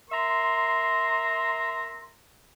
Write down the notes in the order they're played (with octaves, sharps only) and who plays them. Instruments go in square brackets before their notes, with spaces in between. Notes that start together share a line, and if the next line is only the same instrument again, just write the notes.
[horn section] A#4 E5 A#5 C6